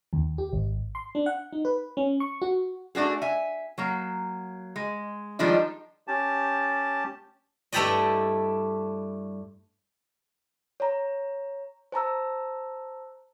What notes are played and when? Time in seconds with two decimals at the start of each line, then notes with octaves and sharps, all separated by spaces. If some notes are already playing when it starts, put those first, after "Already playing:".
0.13 D#2
0.38 G4
0.53 G#1
0.95 C6
1.15 D4
1.26 F#5
1.53 D#4
1.65 B4
1.97 C#4
2.20 C#6
2.42 F#4
2.95 A3 D4 F#4 G#4
3.22 E5 G#5
3.78 F#3 A#3
4.76 G#3
5.39 D#3 F3 G3 G#3 D4 D#4
6.08 C#4 G4 A5
7.73 G2 A3 E4 G4 D5 D#5
10.80 C#5 A#5
11.92 C5 A5 A#5 E6